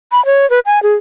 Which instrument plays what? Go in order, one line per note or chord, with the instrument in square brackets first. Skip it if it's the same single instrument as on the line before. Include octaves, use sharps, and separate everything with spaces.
[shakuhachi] B5
C#5
B4
G#5
G#4